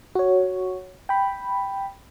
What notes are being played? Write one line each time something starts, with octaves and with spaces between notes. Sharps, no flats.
F#4 C#5
G5 B5